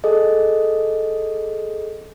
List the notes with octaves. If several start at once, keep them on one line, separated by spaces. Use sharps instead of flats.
G#4 A4 D#5